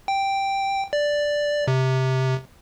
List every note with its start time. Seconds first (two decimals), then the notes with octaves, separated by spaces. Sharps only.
0.08 G5
0.93 D5
1.68 C3